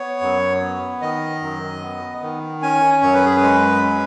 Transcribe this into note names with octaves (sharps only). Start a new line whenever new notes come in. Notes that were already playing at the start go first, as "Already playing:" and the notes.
Already playing: B3 C#5
F#2
B3
D#3 D#5
F#2
B3
D#3
C#4 G#5
F#2 C#5
B4
G#4
B4
G#3
C#4